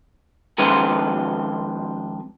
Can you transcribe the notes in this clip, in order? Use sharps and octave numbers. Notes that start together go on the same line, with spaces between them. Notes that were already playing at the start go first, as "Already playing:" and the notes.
F2 D#3 G#3 C#4 B4 C5